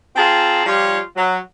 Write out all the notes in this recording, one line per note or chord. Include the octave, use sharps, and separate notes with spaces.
C4 F4 G#4 A5 A#5
F3 G3 F4 G4 C#5
F#3